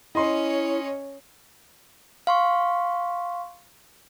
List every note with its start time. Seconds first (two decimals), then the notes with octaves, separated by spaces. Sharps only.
0.15 C#4 E4 C#5 D#5 C6
2.27 F5 C6 C#6